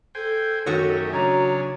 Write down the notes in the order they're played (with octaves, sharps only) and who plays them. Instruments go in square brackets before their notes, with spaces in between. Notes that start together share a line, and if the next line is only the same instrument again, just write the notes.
[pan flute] A4 [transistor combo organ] C5 G5 G#5
[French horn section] F#2 [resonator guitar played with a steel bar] D#3 F#4 C#5 [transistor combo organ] A3 G4 D#5
[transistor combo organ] C#3 C#4 D4 [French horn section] F#3 [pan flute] A#5